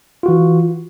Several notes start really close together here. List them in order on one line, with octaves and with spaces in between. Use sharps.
F4 F#4 E3